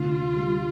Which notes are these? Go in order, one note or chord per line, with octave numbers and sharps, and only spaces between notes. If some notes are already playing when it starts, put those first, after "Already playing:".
Already playing: D2 C3 F4
G3